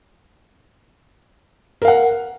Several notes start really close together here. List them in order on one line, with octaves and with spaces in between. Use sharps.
A#4 F5 F#5